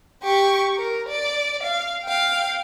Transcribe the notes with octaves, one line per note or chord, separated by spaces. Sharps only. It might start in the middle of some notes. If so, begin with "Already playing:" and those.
G4 C#6
A#4
D5
F5
F5 G5